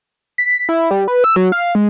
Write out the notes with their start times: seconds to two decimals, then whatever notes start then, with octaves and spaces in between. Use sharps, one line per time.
0.38 B6
0.69 E4
0.91 G3
1.08 B4
1.24 E6
1.36 F#3
1.52 F5
1.75 G#3